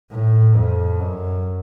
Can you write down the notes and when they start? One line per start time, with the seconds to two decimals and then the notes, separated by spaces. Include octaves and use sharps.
0.11 A2
0.55 F2
1.00 F#2